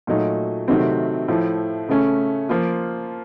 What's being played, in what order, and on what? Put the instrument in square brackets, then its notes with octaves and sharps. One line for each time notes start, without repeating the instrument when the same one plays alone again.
[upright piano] A#2 F#3 A3 D#4
C3 D#3 F#3 A3 C4
A2 F3 A3
C#3 A3 C#4
F3 A#3 F4